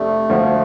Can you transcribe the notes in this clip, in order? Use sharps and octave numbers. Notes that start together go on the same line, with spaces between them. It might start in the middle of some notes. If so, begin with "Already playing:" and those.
Already playing: F2 C3 G3 A3 D4
D2 D3 F3